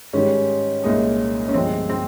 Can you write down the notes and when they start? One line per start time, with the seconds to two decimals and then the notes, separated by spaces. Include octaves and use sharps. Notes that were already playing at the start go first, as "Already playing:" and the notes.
0.13 G#2 D#3 G3 C#4
0.84 C2 A#2 G#3 D#4
1.48 C#4
1.54 G1 G2 F3 G#3 C4
1.89 C4